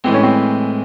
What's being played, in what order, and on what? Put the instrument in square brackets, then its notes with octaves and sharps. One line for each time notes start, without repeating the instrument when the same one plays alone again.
[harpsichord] A2 E3 G#3 [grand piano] C4
[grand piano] C#4
C4